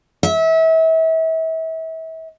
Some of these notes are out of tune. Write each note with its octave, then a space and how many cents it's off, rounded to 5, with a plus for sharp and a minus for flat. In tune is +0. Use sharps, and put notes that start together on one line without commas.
E5 -35